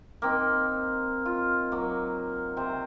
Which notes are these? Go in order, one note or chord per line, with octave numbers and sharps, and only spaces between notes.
A#3 C4 D#4
F4
F#3 A#3
C3 C4 C5